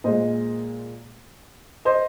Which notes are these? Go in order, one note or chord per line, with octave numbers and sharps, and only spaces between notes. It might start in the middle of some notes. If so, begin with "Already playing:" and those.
A#2 G#3 C5 D#5
C5 D#5